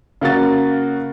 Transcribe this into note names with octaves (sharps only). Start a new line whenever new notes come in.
C#3 A#3 F#4 A6